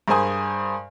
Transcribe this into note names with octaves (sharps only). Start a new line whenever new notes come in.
G2 G#4 A#4 C5 G#5 D#6